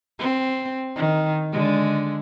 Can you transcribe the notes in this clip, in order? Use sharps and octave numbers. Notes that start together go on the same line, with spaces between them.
C4
D#3
D3 G#3